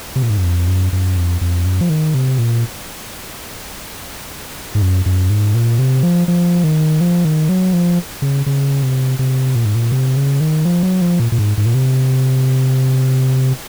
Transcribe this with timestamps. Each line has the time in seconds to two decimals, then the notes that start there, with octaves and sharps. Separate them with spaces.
0.16 C3
0.23 A#2
0.30 G#2
0.37 F#2
0.44 F2
0.68 F#2
0.93 F#2
1.17 F2
1.41 F2
1.66 F#2
1.81 F3
1.89 D#3
2.14 C3
2.38 A#2
4.75 G#2
4.82 F#2
5.06 F#2
5.30 G#2
5.54 A#2
5.79 C3
6.03 F3
6.28 F3
6.64 D#3
7.01 F3
7.25 D#3
7.49 F#3
7.73 F3
8.22 C#3
8.46 C#3
8.83 C3
9.19 C3
9.55 A#2
9.65 G#2
9.75 A#2
9.92 C3
10.17 C#3
10.40 D#3
10.65 F3
10.83 F#3
11.01 F3
11.20 A#2
11.32 A#2
11.39 G#2
11.58 G#2
11.66 A#2
11.74 C3